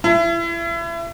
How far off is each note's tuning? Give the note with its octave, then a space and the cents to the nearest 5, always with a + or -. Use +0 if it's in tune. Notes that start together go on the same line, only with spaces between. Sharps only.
E4 +35